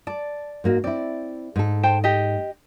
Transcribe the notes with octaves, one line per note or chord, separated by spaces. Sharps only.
D5 A5
G#2 A#3 F#4
C4 E4 D5
G#2 A4
C5 G5 A5
G4 D#5